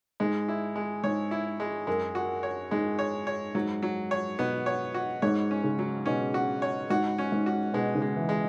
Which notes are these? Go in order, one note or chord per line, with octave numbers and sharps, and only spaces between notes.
G#2 G#3
E4
G#3
G#2 C#5
E4
G#3
F#2 G#3
F#4
C#5
G#2 G#3
C#5
C#5
G#2 F#3
F#3
C#5
B2 B3
C#5
F#4
G#2 C#5
C#4
C#3
F#3
B2 C#4
F#4
C#5
G#2 F#4
C#4
G#2
F#4
B2 G#3
C#3
G#3
E3
G#3